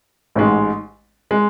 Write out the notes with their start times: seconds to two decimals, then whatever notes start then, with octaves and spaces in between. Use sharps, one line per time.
0.35 A1 G#2 G#3
1.31 G#3